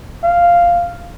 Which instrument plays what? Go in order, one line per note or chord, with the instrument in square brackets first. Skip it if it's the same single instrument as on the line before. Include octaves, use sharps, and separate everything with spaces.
[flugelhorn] F5